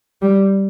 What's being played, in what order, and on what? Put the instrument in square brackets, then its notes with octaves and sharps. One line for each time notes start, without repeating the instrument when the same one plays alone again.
[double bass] G3